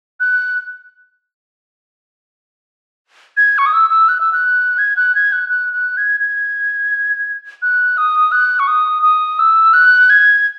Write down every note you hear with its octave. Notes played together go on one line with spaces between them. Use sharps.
F#6
G#6
C#6
D#6
E6
E6
F#6
E6
F#6
G#6
F#6
G#6
F#6
F#6
F#6
G#6
G#6
F#6
D#6
F#6
C#6
D#6
D#6
E6
F#6
G#6